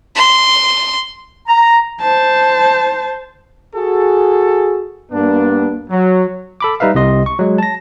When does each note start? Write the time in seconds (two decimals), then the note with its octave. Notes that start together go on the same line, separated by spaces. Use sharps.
0.16 C6
1.48 A#5
2.01 C5 A5
3.75 F#4 G#4 A4
5.12 G2 A#3 B3 D4
5.91 F#3
6.61 A4 B5 D6
6.80 G3 D#4 B4 E5 F5
6.95 C2 C3 D#5 C6
7.26 C#6
7.39 F#3 G#3
7.58 A5 A#6